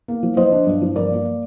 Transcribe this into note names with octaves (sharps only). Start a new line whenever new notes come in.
A#3
F3
F3 C5 D#5
D4
G2
F3
G2 A#4 D5
A#3